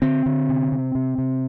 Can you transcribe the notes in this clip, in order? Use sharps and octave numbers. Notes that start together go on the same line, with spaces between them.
D3 C4
D3
C3
C3
C3
C3